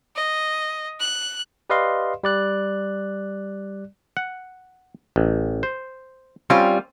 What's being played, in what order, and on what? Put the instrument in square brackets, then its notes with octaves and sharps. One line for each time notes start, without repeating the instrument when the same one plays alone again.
[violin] D#5
F#6
[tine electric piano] G4 B4 D5 D#5 F5 C6
G3 D5 F#6
[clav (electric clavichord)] F#5
A1
C5
[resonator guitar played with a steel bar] G3 F4 [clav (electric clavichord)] C4 C#4